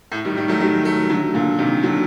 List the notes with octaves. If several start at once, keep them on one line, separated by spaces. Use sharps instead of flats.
A2
D#3 G3
D#3 G3
F#3 A3
D#3 G3
F#3 A3
D3 F#3
A#2 D3
C3 D#3
D3 F#3